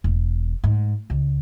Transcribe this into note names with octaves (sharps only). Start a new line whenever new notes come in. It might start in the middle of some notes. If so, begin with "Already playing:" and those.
E1
G#2
C#2